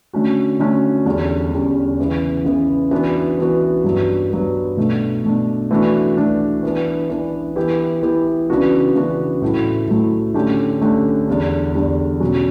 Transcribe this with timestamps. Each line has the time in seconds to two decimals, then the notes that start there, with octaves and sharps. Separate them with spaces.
0.13 D3 A3 C#4 F#4
0.59 D3 A3 C#4 F#4
1.06 E2 D3 G3 C#4
1.52 E2 D3 G3 C#4
1.98 C#3 E3 B3
2.45 C#3 E3 B3
2.91 E3 B3 D4 F#4
3.39 E3 B3 D4 F#4
3.84 G2 F#3 B3
4.30 G2 F#3 B3
4.77 B2 A3 D4
5.24 B2 A3 D4
5.71 E3 A3 D4 F#4
6.17 E3 A3 D4 F#4
6.63 E3 B3 D4
7.09 E3 B3 D4
7.56 E3 B3 E4 G4
8.03 E3 B3 E4 G4
8.50 C#3 E3 B3 D4 F#4
8.96 C#3 E3 B3 D4 F#4
9.42 A2 F#3 A3 E4
9.88 A2 F#3 A3 E4
10.34 D3 A3 C#4 G4
10.81 D3 A3 C#4 G4
11.27 E2 D3 G3 D4
11.75 E2 D3 G3 D4
12.20 B2 F#3 C#4 F#4